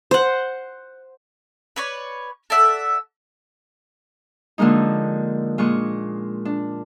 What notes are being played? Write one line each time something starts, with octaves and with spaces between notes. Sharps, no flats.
C5 F#5
B4 C#5 D5
A4 D5 E5 F#5
D3 F3 G#3 A#3 D#4
A#2 G#3 G#4 C#6
D4